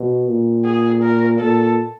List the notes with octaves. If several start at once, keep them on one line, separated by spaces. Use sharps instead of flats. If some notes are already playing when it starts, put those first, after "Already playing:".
Already playing: B2
A#2
G#4
A#4
A#2 A4